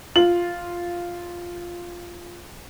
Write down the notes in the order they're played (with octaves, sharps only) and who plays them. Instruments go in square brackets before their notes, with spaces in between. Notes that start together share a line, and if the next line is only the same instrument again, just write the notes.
[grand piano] F4 F#7